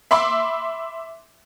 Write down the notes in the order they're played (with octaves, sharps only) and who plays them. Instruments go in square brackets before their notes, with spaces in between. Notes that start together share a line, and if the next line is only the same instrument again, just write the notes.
[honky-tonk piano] E5 B5 C6 D6 E6